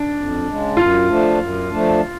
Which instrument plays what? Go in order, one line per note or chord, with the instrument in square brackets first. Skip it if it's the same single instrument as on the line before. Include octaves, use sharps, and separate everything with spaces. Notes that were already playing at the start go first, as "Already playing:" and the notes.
Already playing: [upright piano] D4
[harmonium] F2
C#3 G#3
[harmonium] F#2 [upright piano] F4
[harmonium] F3 A3 D4
F#2
F3 A3 D4